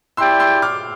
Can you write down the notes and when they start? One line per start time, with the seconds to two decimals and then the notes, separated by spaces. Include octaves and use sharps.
0.17 E4 G4 D5 G5 C6 E6
0.40 C6 E6
0.62 D6 F6